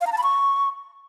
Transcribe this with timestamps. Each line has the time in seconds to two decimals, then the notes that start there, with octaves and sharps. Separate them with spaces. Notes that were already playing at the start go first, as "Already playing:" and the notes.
0.01 F5
0.07 A#5
0.12 A5
0.18 B5
0.23 C#6